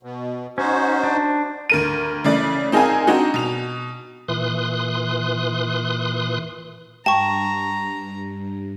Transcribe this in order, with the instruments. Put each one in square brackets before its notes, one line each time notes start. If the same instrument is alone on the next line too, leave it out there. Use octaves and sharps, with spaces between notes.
[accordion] B2
[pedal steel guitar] C#4 [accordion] D#4 F#4 C5
[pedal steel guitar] D4
[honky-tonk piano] D2 A#4 D#7
C#3 E3 A3 D5 A6
C4 D#4 G#4 A#4 F5 G#5
C4 D4 D#4 F#4
B2 F7
[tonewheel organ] A#2 E3 C6 D#6 F#6
[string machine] G2 [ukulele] G5 [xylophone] A5 C#6 [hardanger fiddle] A#5